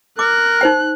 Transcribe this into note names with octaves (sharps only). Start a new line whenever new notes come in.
A#4 D6 F#6
D#4 C5 G5